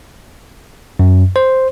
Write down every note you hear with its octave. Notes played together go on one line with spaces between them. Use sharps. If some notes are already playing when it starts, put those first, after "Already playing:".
F#2
C5